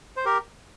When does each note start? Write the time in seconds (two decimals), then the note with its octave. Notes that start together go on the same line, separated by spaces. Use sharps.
0.17 C5
0.25 G4 A#4